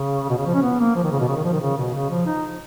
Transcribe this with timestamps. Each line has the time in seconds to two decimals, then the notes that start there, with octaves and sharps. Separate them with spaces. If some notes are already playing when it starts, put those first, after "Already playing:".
Already playing: C#3
0.30 B2
0.38 C#3
0.46 F3
0.55 C#4
0.62 B3
0.79 A#3
0.96 F3
1.04 D#3
1.12 C#3
1.20 B2
1.28 C#3
1.36 D#3
1.44 F3
1.53 D#3
1.61 C#3
1.77 B2
1.94 C#3
2.10 F3
2.26 D#4